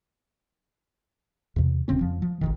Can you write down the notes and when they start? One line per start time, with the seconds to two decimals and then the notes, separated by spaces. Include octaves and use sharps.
1.56 E2 C3
1.88 D#1 C#3 C4 C#4
2.01 F2 F3
2.22 F3
2.41 G#1 F2 D#3